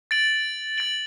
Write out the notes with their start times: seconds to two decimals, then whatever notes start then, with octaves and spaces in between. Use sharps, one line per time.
0.11 A6 D7 F#7
0.78 A6 D7 F#7